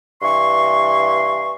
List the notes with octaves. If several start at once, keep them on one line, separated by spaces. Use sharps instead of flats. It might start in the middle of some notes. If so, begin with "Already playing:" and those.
G2 E3 C6 C#6